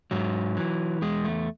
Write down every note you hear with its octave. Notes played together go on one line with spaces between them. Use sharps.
G#2 F#3
E3
E2 G#3
A3